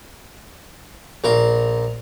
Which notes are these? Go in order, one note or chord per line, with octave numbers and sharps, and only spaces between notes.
A#1 A#4 F5